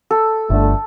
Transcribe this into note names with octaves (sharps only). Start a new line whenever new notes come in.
A4
G1 D3 A3